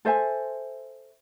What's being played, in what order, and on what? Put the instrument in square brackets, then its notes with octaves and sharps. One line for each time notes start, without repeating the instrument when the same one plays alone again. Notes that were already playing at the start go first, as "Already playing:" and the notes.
[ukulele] A4 C5 E5 G#5